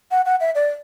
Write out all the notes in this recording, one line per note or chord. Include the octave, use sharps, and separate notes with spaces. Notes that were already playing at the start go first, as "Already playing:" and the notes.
F#5
F#5
E5
D5